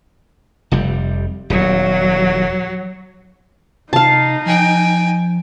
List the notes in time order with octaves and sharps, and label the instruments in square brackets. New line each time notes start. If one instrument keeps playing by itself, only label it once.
[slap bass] F1 C3 G3
[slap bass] D#1 E2 [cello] F#3
[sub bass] C3 [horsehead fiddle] D#4 [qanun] F5 A5
[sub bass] F3 [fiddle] G5 G#5